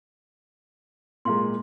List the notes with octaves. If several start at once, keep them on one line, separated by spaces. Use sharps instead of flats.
A#2 G#3 E4 F5 C6